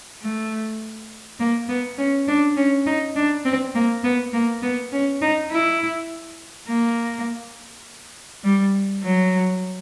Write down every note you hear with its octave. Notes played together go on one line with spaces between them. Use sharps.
A3
A#3
B3
C#4
D4
C#4
D#4
D4
C4
A#3
B3
A#3
B3
C#4
D#4
E4
A#3
G3
F#3